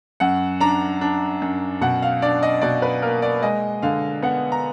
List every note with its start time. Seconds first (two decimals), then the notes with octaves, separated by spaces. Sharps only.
0.20 F#2 F#5
0.60 D4 A#5
1.01 D4
1.42 F#2
1.81 B2 F#5
2.02 F5
2.22 D4 D5
2.43 D#5
2.62 B2 D5
2.82 B4
3.02 A#3 A#4
3.22 D5
3.42 G#3 D#5
3.82 D3 F5
4.22 B3 F#5
4.52 A#5